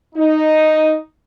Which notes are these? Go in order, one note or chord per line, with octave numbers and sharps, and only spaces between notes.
D#4